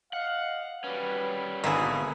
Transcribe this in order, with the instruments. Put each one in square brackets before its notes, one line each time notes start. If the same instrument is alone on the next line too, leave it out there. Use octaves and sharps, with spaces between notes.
[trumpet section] D#5 F5 [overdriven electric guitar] F#5
[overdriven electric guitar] G3 C#4 [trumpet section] F#4 B4
[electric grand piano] G#1 D3 [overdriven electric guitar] B2 [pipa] A#3 E4 G#4 [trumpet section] F#4 B4